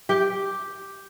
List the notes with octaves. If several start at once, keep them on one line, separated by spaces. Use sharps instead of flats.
G4 G5